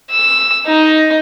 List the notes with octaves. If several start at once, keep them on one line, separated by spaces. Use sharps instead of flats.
E6
D#4 D#5